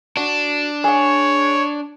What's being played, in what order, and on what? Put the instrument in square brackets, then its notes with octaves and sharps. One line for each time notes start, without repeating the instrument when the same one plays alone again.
[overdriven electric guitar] D4 [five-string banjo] F#4
[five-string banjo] G#4 F#5 [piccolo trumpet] C#5